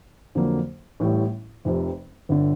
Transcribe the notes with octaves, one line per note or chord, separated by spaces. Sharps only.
F2 D3 F#3 A#3
A1 A2 E3 G3
F1 F2 C3
G1 D3